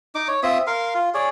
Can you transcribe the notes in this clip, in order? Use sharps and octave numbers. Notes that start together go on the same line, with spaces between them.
D#4 D6
C#5
C4 F4 E5 D#6
A#4 F5 C6
F4
G#4 C#5 D5